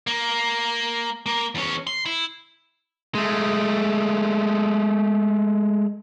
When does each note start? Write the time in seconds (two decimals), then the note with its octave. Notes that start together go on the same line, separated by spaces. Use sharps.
0.07 A#3
1.26 A#3
1.55 E2 C#4
1.87 C6
2.06 E4
3.15 G#3 A3